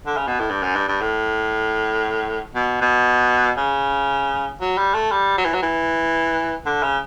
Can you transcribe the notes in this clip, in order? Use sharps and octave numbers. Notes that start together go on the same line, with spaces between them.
D3
C#3
B2
A2
G2
F#2
G2
G2
A2
B2
B2
C#3
F#3
G3
A3
G3
F#3
E3
F#3
E3
D3
C#3